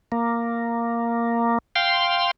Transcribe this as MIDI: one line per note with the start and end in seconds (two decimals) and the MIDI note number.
0.12 1.58 58
1.76 2.31 77
1.76 2.31 79
1.76 2.31 84